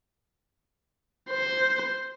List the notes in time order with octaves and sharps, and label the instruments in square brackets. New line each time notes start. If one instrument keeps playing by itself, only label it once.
[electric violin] C5